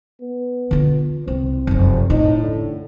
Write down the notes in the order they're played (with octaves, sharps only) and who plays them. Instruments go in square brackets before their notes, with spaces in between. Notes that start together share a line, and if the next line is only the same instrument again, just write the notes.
[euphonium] B3
[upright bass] D3 F4
[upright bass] C2 [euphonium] C4
[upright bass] F1 F#2
[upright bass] A2 [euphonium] D#4
[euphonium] D3